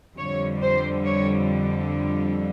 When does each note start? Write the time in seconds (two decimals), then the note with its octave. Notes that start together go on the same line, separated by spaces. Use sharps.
0.17 F2 D3 G3 C#5
0.62 C5
1.05 C#5